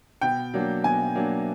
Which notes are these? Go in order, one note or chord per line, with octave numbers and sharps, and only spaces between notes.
B2 G5
F#3 A#3 D4
B2 G#5
F#3 A#3 D4